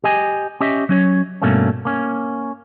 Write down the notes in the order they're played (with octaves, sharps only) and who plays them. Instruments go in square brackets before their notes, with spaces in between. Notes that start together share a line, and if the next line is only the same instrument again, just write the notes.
[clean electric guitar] G4 D#5 G#5
C#4 G4 D#5 E5
F#3 C#4 C#5
G2 B2 A3 A#3 C#4
A#3 C#4